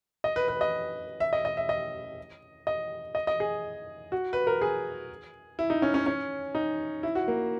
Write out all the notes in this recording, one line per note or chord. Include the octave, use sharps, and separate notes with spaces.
D#5
B4
B4
D#5
E5
D#5
D#5
E5
D#5
D#5
D#5
D#5
G#4
F#4
B4
A#4
G#4
E4
D#4
C#4
C#4
C#4
D#4
E4
F#4
A#3